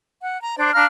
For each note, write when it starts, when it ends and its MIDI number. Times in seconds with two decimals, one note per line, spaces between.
0.22 0.39 78
0.42 0.55 82
0.57 0.71 62
0.57 0.71 72
0.57 0.71 74
0.75 0.85 62
0.75 0.85 77
0.75 0.85 82
0.75 0.85 89